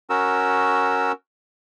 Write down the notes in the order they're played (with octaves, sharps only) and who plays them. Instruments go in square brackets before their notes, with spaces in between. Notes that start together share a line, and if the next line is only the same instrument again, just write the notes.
[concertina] C#4 F#4 A#4 E6